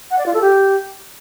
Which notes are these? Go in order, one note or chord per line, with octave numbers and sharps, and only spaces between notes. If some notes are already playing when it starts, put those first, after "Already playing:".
F#5
D5
F4
A4
G4